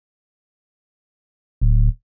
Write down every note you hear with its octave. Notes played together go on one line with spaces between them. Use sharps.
D1